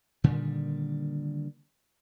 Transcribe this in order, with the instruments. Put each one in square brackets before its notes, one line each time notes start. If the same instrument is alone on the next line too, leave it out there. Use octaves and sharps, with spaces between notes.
[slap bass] A#2 D3 D#3 G3